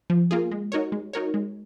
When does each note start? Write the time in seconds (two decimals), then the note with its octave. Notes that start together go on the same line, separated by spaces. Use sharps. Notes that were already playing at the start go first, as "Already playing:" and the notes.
0.10 F3
0.31 A#3 F4 G#4
0.52 G#3
0.72 D#4 F#4 A#4 C#5
0.92 G#3
1.13 D#4 F#4 A#4 C#5
1.34 G#3